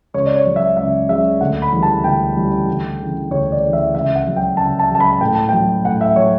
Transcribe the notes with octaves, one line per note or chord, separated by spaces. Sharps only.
C#2 C#5
D5
C#5
C#3 F#3
E5
C#2 E5
C#3 F#3 E5
D2 F#5
B5
C#3 E3 G3
A5
D2 G5
C#3 E3 G3
D2
C#3 E3
D2 C#5
D5
C#3 E3
E5
C#2 E5
F#5
C#3 F#3
G5
C#2 A5
A5
C#3 F#3
A5
B5
A2 G5
A5
F#3 G5
A2 F#5
E5
F#3 C#5